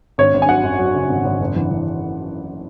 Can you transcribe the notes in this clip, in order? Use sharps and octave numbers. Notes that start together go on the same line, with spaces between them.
G#1 C#5
G#1
G#5
F#3 F#5
F#2
F#3
C#3
G#1
G#1
F#1
E3
E3